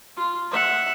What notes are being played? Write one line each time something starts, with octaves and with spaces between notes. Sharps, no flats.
F4
E5 F#5